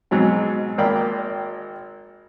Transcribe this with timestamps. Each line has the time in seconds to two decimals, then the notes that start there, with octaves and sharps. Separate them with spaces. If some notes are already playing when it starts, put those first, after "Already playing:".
0.11 G#2 B2 F#3 C4
0.78 G#1 A#3 A#4 D5 G5 B5